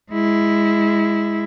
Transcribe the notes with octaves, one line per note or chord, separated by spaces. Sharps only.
G#3 E4